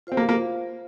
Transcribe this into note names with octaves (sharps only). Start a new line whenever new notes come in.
C4 F4 C5 F5
A#3
A#3